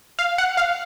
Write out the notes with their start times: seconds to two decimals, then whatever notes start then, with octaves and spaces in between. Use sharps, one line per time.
0.19 F5
0.38 F#5
0.57 F5